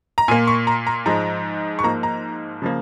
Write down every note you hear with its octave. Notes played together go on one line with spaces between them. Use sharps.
A#5
A#2 A#3 G#5
C#6
A#5
A#5
G#2 F3 G#3 A#5
C#6
G#2 F3 A#3 A#5
A#5
C#3 F3 A#3